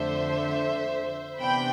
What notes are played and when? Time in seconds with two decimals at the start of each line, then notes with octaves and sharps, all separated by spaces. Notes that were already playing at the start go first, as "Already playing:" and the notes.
Already playing: F2 D3 A3 C5 E5
1.39 C3 E3 B3 D4 G5 B5